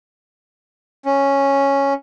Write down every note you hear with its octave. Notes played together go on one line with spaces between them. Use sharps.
C#4